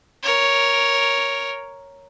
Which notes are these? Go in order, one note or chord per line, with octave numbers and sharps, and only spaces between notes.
A#4 C#5